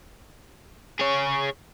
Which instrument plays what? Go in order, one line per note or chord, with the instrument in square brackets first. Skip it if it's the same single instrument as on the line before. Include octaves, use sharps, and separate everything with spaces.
[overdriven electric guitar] G#4 C#5